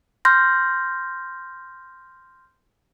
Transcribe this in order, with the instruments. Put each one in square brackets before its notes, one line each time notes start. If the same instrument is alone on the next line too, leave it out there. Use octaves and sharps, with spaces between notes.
[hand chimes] C6 F6 G6 A#6